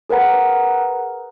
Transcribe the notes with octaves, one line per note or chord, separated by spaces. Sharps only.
G#4 A#4 B4 F#5 A#5